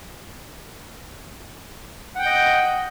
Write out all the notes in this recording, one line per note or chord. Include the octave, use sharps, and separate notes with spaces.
D#5 F#5 G5 G6